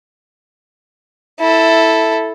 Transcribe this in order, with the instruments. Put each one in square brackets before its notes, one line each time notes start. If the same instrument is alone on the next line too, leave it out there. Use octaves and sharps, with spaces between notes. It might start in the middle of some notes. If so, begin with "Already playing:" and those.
[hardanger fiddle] E4 A4